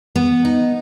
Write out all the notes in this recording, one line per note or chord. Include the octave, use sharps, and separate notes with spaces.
B3
D#4